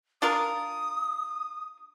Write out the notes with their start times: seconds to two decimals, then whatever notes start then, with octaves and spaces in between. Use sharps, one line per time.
0.22 D4 F4 A#4 D#6